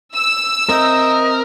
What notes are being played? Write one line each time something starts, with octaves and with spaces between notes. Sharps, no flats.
E6
C4 A#4 D#5 E5 G5